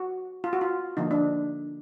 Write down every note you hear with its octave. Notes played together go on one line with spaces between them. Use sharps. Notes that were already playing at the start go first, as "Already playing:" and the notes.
Already playing: F#4
F4
F#4
F4
D3 F3 A#3 D#4
D4